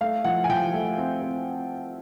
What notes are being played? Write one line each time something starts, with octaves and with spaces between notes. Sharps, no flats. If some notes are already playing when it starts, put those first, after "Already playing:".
A3 F5
F3 F#5
G#5
F3 G5
A3
C4
C4